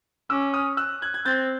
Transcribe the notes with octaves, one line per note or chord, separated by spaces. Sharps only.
C#4 D6 E6
D#6 F6
E6 F#6
F#6 G#6
G#6
C4 G6 A6